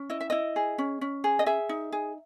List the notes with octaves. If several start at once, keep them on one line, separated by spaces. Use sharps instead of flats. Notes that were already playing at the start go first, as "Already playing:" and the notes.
Already playing: C#4
E4 D#5
E5
E4 D#5
G#4
C#4
C#4
G#4
D#5
G#4 E5
D#4
G#4